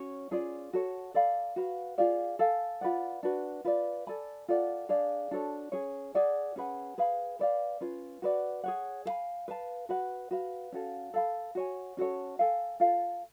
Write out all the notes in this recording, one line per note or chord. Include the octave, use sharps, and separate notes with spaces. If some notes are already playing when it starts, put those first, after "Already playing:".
Already playing: C#4 F#4 C#5
C#4 F4 G#4 D5
F#4 A4 C#5
A4 D5 F5 B5
F#4 B4 F5
F4 G#4 D5 F5
A4 F5 G#5
F4 B4 D5 F#5
D4 F#4 B4
F4 B4 D5
A4 D5 G#5 B5
F4 A4 D5 F#5
D4 G#4 D5 F5
D4 F#4 A4 C#5
C#4 G#4 C#5
G#4 D5 F#5
C#4 G#4 B4 F#5
G#4 B4 F5 B5
B4 D5 F5
C#4 F4 B4
F#4 B4 D5 F#5
G#4 C#5 F#5
A4 F5 G#5 B5
B4 F5 A5
F#4 B4 F#5
F#4 B4 F5
C#4 F#4 A4 F5
A4 F5 B5
F#4 C#5 G#5
C#4 F#4 A4 C#5
A4 F5 G#5
F4 A4 F5